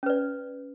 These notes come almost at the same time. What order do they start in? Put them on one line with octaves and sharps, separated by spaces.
C#4 B4 D5